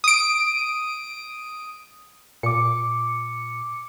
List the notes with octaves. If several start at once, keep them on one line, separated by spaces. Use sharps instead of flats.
D#6 D7
A#2 D6 C#7